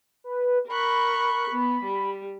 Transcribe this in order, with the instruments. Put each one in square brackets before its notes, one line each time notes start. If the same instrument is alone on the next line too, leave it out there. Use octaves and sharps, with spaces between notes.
[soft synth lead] B4
[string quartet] A#4 C#6 F#6 [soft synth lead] B5
[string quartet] B3
G3